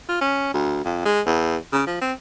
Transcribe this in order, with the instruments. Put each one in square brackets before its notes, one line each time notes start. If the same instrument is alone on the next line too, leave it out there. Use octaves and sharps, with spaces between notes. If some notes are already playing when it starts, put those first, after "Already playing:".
[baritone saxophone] F4
C#4
D2
F2
G#3
E2
C#3
F3
C4